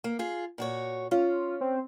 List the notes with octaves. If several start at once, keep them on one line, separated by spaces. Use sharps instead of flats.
A#3
F4 G#4
A#2 F#4 C#5
C#4 F4
C4